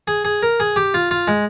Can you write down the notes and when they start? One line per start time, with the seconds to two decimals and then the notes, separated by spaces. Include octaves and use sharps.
0.07 G#4
0.25 G#4
0.42 A#4
0.60 G#4
0.76 G4
0.94 F4
1.11 F4
1.28 G#3